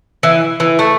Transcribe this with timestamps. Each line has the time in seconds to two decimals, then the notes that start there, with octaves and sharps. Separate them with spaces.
0.23 E3
0.60 E3
0.79 A3